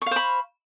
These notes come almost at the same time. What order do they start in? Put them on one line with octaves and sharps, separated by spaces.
C#6 F5 C5 B5